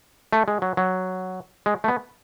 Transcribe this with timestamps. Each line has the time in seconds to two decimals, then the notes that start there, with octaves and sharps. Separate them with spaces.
0.33 A3
0.48 G#3
0.62 F#3
0.77 F#3
1.66 G#3
1.84 A3
1.88 B3